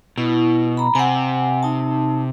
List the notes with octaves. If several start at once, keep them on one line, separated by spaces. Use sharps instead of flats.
B2 E4
A#5 B5
C3 F#5 G#5
D#4 A5